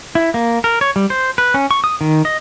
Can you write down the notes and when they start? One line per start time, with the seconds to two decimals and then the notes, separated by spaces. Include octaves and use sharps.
0.15 E4
0.34 A#3
0.64 A#4
0.81 C#5
0.96 G3
1.10 C5
1.38 B4
1.54 C#4
1.71 C#6
1.84 D#6
2.01 D#3
2.25 D#5